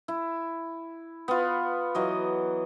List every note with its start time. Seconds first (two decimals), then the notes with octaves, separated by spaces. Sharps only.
0.08 E4
1.28 B3 F4
1.95 E3 F#3 D#5